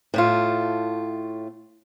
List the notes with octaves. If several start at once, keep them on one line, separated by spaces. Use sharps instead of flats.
A2 A3 F4